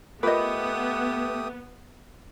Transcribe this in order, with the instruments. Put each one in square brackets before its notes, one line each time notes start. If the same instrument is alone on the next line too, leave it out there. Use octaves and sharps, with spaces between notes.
[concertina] A3 G4 D#6 [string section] B3 [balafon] F4 A#4 [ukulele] B4 D#5